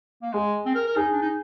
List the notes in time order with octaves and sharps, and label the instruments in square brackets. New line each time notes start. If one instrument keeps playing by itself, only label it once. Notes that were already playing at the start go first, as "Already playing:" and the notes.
[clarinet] A#3
[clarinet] G#3 [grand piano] G#4
[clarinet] C4
A#4
A#4
[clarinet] D#4 [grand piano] G#4
[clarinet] D4
D#4